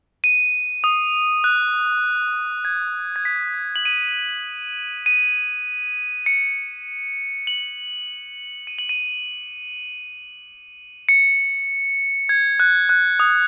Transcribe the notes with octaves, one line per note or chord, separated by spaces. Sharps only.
D#7
D#6
F#6
G#6
G#6
B6
F#7
D#7
D#7
C#7
F#7
D#7
F#7
D#7
C#7
G#6
F#6
F#6
D#6